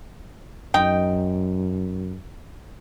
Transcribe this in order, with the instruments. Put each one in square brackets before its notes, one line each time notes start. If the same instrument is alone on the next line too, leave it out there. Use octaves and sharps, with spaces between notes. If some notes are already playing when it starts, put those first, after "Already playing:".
[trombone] F#2 [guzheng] D#4 [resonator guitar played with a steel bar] G5